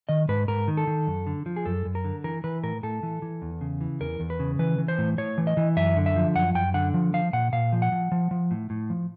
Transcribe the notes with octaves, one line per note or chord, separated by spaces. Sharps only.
D#3 D#5
G#2 B4
G#2 A#4
D#3
A4
D#3
F#2
D3
F3
G#4
F#2 A4
F#2
A#4
D3
E3 A#4
E3 B4
A2 A#4
A2 A4
E3
E3
E2
C#3
E3
E2 A#4
E2
B4
C#3
E3 B4
E3
C5
A2
A2 C#5
E3
D#5
E3
F#2 E5
D3
E5
F3
F#2 F#5
F#2 G5
D3 F#5
F3
F3 F5
A#2 F#5
A#2 F5
F3
F#5
F3
F3
F3
A2
A2
F3